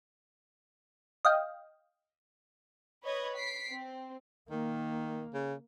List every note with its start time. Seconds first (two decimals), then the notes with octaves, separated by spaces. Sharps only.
1.25 D#5 F5 G5
3.04 B4 C#5 D#5 G#6
3.36 B6 C7 D7
3.70 C4
4.51 D#3 A#3
5.34 C#3